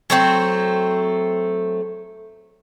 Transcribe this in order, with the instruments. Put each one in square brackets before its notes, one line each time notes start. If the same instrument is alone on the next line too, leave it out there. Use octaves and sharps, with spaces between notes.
[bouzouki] F#3 A3 C4